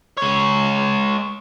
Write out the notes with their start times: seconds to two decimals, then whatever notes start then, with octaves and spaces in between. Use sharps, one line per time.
0.17 G#3 C#5